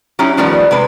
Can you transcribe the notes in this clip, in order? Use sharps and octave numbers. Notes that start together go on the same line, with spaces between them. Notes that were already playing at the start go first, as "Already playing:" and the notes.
F#3 C#4 D#4 E4 G4
D#3 F3 G3 A3 B3
C3 G#3 B4